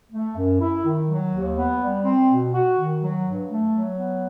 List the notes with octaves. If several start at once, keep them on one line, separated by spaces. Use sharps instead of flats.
A3
F#2
E4
D#3
F#3
D#2
B3
G3
C4
B2
F#4
D#3
F#3
G2
A3
F#3
B3